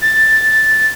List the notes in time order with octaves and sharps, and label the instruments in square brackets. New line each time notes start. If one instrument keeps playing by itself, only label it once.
[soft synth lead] A6